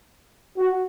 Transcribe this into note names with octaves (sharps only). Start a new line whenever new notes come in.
F#4